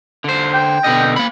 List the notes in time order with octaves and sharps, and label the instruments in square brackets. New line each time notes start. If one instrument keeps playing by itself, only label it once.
[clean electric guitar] D3 C5
[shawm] G5
[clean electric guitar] B2 D3 D#5
A#3 B5